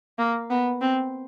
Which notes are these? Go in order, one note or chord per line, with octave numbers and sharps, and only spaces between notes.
A#3
B3
C4